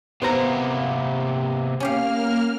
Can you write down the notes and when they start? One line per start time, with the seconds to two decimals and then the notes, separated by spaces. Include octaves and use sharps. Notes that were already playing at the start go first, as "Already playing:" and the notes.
0.22 C3 A#3 B3 C5 A#5
1.80 A#3 C#4 G4 F5 F6